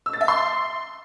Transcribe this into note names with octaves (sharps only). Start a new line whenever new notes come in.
E6
A6
E5
C6